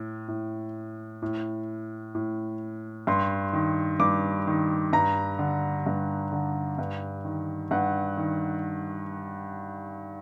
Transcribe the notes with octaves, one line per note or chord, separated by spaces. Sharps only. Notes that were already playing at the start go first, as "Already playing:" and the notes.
Already playing: A2
A2
A2
A2
G2 C6
D#3
G2 D6
D#3
G2 A#5
D3
G2
D3
G2
D#3
G2 F#5
D#3